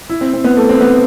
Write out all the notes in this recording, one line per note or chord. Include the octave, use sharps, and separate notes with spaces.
E4
C4
C4
B3
A3
C4
B3